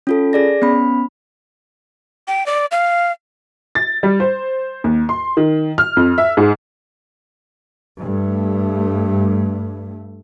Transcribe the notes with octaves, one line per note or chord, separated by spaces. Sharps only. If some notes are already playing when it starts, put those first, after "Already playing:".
C#4 F4 A4
G#4 D5 A#6
B3 C#4 B5
G5
D5
F5
A6
G3
C5
D#2
C6
D#3
F6
F2
E5
G#2
G2 A3